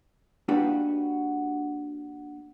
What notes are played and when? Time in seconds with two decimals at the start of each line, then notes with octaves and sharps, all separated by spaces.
0.48 A#3 D4 D#4 F#4 G4 B4